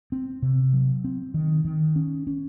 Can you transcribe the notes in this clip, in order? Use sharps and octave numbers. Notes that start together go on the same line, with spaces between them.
C4
C3
F#3
C4
D#3
D#3
C#4
C#4